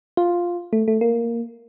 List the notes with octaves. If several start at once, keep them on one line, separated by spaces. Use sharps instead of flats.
F4
A3
A3
A#3